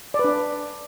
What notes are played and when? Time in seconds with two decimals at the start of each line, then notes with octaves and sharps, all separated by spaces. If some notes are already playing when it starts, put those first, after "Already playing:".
0.14 D5
0.19 B4
0.24 D4